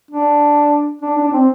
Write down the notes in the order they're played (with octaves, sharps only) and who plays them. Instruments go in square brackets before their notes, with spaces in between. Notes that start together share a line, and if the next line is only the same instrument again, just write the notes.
[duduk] D4
D4
D4
D4
C4